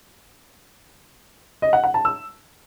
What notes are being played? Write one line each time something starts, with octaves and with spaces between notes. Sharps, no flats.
D#5
F#5
F#5
A5
E6